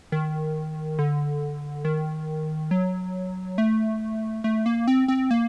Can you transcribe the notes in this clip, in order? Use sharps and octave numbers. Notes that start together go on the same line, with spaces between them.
D#3
D3
D#3
F#3
A3
A3
A#3
C4
C4
A#3